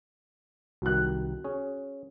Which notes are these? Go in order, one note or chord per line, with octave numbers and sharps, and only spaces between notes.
C2 D#3 F#3 F#6
C#4 G#4 C#5